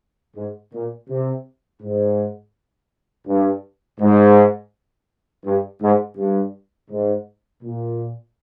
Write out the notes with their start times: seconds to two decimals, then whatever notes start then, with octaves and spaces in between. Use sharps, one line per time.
0.36 G#2
0.73 A#2
1.09 C3
1.82 G#2
3.27 G2
4.00 G#2
5.45 G2
5.81 G#2
6.17 G2
6.91 G#2
7.63 A#2